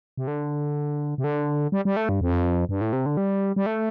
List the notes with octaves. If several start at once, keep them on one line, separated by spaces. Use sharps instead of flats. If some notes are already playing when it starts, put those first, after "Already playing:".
C3
D3
C3
D3
G3
G3
A3
G2
F2
G2
A2
C3
D3
G3
G3
A3